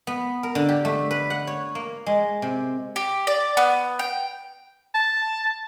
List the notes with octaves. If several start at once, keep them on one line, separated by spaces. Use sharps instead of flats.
B3
A#4
D3
G4
A3
B4
F#5
C#5
A#3
G#3
C3
G4
D5
B3
G5
A5